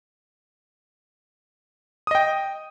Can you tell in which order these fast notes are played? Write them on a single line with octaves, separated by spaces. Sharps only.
D#6 D#5 G5